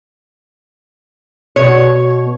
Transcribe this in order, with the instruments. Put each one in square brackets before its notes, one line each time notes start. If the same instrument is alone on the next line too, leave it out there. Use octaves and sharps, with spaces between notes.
[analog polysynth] B2 [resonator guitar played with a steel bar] C#5